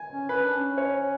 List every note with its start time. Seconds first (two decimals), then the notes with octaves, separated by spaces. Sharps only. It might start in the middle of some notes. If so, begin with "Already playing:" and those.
Already playing: G#5
0.13 C#4
0.29 C#4 B4
0.43 D4
0.57 C#4
0.78 C#5